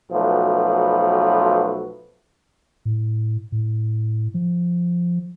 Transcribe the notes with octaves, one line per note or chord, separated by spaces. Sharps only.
B1 F3 A3 F#4 B4
A2
A2
F3